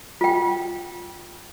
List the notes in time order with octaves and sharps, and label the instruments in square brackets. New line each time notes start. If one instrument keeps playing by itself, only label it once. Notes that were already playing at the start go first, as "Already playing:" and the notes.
[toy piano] F4 G5